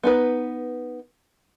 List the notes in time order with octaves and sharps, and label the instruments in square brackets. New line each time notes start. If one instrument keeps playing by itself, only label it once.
[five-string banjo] B3 D#4 B4